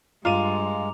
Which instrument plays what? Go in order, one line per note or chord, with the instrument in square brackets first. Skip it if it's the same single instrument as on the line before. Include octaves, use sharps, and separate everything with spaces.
[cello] G2 [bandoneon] G#3 [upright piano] F4 D#7 [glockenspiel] A#5 D6 F7